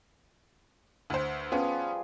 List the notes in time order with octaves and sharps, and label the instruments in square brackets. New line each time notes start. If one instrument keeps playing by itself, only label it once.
[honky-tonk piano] D2 C5 [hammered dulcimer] B4
[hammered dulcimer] F3 G3 G#4 [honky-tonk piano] B3 C#4